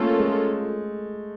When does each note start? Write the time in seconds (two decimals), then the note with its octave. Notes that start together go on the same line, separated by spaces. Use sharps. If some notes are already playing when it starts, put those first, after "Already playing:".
Already playing: A3 A#3 C#4 F4 A4
0.19 G#3